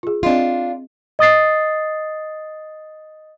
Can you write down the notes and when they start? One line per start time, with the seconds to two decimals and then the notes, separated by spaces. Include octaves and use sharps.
0.03 F4 G#4
0.23 C4 D4 F4 D#5 C6
1.19 D#5 D#6 A6 C7